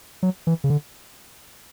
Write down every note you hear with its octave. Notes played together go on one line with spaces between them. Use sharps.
F#3
E3
C#3
D3